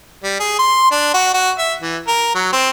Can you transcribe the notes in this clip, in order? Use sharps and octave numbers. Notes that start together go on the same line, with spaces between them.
G3
G#4
C6
D4
F#4
F#4
E5
E3
A#4
F#3
C4